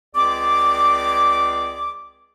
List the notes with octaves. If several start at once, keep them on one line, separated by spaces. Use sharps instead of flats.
C#2 C4 G#4 D5 D6